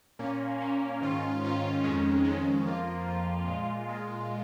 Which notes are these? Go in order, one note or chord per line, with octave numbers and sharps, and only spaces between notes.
A#2 A#3 C#4
A#2 A#3 C#4
G#2 D#3 C#4 F4
G#2 D#3 C#4 F4
F2 D#3 G#3 C#4
F2 D#3 G#3 C#4
F2 F3 A#3 F4
F2 F3 A#3 F4
A#2 G#3 F4
A#2 G#3 F4